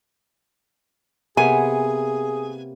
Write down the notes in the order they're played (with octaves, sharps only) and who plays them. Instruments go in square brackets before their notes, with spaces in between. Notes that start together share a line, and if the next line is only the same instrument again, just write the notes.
[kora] C3 A#3 B3 [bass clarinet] G#4 [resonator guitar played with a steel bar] G#5